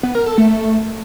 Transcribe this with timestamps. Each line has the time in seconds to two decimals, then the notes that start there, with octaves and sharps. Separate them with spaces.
0.03 B3
0.15 A#4
0.26 A4
0.38 A3